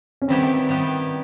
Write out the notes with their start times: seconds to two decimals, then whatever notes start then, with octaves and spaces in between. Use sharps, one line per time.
0.22 C#4
0.28 D#3 G3 B3 C4 E4 G4
0.69 D#3 G3 B3 E4 G4